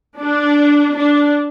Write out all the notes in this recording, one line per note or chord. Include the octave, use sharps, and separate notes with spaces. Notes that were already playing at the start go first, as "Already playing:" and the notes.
D4
D4